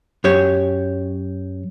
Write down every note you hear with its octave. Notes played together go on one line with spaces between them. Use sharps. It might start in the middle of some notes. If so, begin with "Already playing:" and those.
F#2 G4 C#5